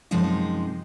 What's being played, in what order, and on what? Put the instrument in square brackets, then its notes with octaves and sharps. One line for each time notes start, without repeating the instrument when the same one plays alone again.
[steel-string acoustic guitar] F#2 C3 F3 G#3 D#4